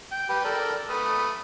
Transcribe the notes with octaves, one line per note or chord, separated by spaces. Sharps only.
G5
G4 B4
A4 A#4 D5
A3 B4 D#6